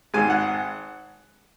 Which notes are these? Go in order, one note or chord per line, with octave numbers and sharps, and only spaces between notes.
G#1 G#2 G#3 G#5
F#5